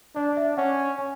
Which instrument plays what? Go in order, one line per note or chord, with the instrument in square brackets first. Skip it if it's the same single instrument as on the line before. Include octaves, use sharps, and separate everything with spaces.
[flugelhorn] D4 [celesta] D5
[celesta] E5
[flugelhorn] C#4 [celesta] F#5
[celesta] G#5